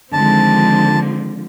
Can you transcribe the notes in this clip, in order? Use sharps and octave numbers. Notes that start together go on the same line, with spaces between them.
D3 D#3 F3 G#3 C4 A5